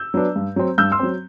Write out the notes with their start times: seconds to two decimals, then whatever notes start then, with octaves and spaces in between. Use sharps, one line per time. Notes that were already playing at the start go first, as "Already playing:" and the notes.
Already playing: E6 G6
0.14 F#3 B3 D4
0.36 G2
0.56 F#3 C4
0.78 G2 E6 G6
0.92 C6 E6
0.99 F#3 C4